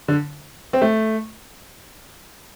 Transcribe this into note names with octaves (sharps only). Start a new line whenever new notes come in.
D3
C4
A3